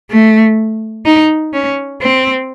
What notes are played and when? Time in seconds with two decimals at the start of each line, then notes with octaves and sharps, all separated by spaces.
0.11 A3
1.06 D#4
1.53 C#4
2.01 C4